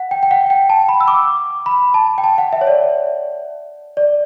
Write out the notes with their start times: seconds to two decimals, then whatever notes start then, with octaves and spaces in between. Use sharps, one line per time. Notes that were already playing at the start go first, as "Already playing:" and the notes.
Already playing: F#5
0.11 G5
0.23 G5
0.31 F#5
0.50 G5
0.70 A5
0.89 B5
1.01 E6
1.08 D6
1.66 B5
1.94 A5
2.18 G5
2.24 A5
2.38 F#5
2.53 E5
2.61 C#5
2.67 D5
3.97 D5